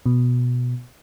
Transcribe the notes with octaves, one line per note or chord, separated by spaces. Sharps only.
B2